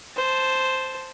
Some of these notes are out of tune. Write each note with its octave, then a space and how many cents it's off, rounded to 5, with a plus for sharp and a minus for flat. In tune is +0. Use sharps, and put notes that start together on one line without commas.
C5 +0 A5 +0